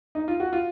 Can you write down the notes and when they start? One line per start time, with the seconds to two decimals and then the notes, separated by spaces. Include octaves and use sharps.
0.15 D#4
0.28 F4
0.40 F#4
0.53 F4